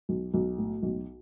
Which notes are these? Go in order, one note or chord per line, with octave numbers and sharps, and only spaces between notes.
B1
B1
A2
B1